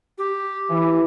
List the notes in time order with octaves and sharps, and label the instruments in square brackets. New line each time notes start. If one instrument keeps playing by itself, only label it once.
[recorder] G4
[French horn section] E3